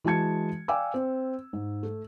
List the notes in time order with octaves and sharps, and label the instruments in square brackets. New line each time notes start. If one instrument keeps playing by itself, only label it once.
[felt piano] E3 G#3 F#4 A5 G#6 C#7
D5 F5 G5 G#5 D6 E6
C4
G#2
A3